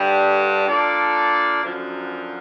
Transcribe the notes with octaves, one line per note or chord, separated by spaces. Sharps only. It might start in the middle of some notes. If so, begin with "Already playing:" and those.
Already playing: G2 D3 G3
A#3 D4 F4 A4 D5
F#2 D3 F3